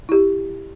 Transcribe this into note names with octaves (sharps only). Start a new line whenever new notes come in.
E4 G4